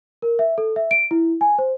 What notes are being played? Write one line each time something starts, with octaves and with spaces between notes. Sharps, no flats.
A#4
E5
A4
E5
D7
E4
G#5
C5